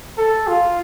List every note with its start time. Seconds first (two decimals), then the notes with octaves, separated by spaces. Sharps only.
0.18 A4
0.47 F4